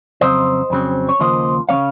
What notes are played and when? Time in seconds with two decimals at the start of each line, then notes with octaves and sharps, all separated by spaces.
0.21 F2 C#3 F#3 C4 C5 D#5
0.70 F2 C#3 F#3 C4
1.09 C#5
1.19 D#2 C#3 F3 A#3 C5 D#5
1.69 C#3 F3 A#3 C#4 C#5 F5